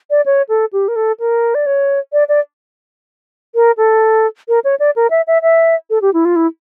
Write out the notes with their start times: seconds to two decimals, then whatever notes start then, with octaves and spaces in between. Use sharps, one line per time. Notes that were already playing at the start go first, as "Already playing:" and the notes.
0.10 D5
0.26 C#5
0.49 A4
0.73 G4
0.88 A#4
0.96 A4
1.20 A#4
1.55 D5
1.66 C#5
2.13 D5
2.29 D5
3.55 A#4
3.77 A4
4.48 A#4
4.64 C#5
4.80 D5
4.96 A#4
5.11 E5
5.27 E5
5.42 E5
5.90 A4
6.02 G4
6.14 E4
6.25 F4
6.36 E4